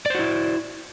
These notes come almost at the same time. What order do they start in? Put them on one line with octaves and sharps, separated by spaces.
D5 C5 F#4 E4